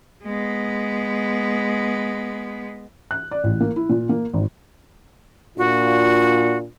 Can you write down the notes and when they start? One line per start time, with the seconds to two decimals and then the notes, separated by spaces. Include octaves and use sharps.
0.24 G#3 B3
3.11 F#6
3.31 D5
3.44 A1
3.61 A#3
3.76 E4
3.90 A#2
4.09 A#3
4.33 G#1
5.58 A#2 D4 F4 F#4